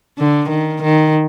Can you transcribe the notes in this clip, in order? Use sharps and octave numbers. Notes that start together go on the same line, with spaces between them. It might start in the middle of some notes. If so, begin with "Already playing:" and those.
D3
D#3
D#3